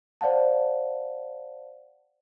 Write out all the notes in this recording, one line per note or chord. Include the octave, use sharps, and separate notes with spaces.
C5 D5 F5 F#5 A5